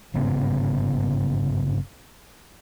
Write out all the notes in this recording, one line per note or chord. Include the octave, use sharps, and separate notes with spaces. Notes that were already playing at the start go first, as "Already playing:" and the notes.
G1 G#2 C#3 B3